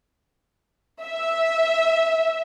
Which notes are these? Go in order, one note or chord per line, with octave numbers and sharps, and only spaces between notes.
E5